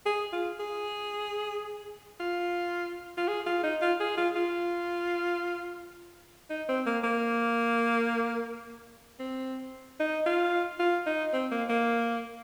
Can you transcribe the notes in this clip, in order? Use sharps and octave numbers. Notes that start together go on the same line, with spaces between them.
G#4
F4
G#4
F4
F4
G#4
F4
D#4
F4
G#4
F4
F4
D#4
C4
A#3
A#3
C4
D#4
F4
F4
D#4
C4
A#3
A#3